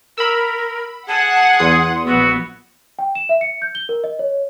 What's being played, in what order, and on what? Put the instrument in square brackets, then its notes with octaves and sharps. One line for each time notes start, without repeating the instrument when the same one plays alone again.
[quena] A#4 [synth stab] B5 E6
[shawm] G#4 [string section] F#5 [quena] A5
[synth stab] E2 D#6 [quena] C6
[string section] A#1 B3 [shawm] F#4 [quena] E6
[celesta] G5
E7
E5
C#7
G6
G7
A#4
D#5
C#5